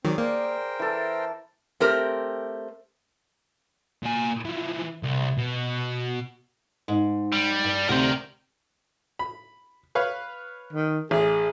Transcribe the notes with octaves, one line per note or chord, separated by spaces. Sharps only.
D#3 F#3 C4 G#4 D5
A#3 A#4 C5 G5
E3 A4
A3 C4 G4 A#4
A#2 G#5
E3 F3
C2
B2
G#2
G3
G2
D2 C3 A#4 G5
B5
B4 C#5 F5
D#3
A1 G#4